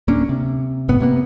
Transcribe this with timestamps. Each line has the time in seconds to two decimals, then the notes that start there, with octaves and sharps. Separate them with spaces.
0.08 D1 A#3 C#4 D4
0.29 C3
0.89 F#1 A2 B3
1.00 C3 A#3 B3